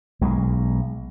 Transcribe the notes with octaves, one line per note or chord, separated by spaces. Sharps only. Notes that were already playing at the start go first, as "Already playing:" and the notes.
B1 G#3